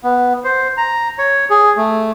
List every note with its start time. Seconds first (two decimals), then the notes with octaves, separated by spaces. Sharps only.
0.04 B3
0.44 C5
0.77 A#5
1.18 C#5
1.50 G#4
1.77 A3